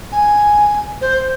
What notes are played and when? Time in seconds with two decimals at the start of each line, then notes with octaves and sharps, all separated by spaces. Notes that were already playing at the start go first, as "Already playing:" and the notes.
0.12 G#5
1.01 C5